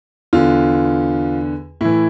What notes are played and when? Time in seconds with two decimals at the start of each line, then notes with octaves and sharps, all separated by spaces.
0.33 E2 D3 F4
1.81 A2 E3 E4